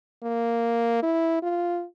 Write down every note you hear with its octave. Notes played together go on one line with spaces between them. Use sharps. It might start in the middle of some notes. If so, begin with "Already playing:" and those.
A#3
E4
F4